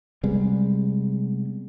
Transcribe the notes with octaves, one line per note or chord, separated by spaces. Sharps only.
C3 G3 G#3 B3